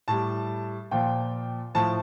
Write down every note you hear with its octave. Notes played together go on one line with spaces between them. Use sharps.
A2 G3 A5
A#2 F3 G5
A2 F3 A5